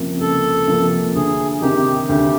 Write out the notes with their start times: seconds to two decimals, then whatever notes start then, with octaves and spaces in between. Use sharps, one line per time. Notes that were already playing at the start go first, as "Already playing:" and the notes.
Already playing: C#2 C3 F3 A#3
0.21 C#2 A4
0.67 C3 F3 A#3
1.15 D2 G#4
1.62 C3 D#3 G4
2.09 D2 G4